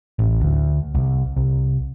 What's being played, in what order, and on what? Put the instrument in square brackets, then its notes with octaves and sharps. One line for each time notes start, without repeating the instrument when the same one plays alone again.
[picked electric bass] A1
D2
C2
C2